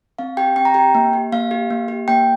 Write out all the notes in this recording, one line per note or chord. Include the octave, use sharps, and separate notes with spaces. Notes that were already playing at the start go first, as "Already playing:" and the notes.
C4 F5
G4 G5
C4 G5
A#5
G4 G5
A#3
G4
A#3 F5
G4
A#3
G4
A#3 G5